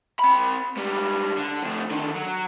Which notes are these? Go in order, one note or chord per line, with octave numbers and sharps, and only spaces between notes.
C4 B5
G#2 G3
D3
F2 A3
D3 D#3
F#3